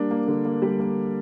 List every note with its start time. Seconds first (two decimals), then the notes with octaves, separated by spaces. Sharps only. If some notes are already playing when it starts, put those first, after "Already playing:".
Already playing: G3 A#3 D4
0.11 A#3
0.28 D3
0.45 A#3
0.62 G3
0.79 A#3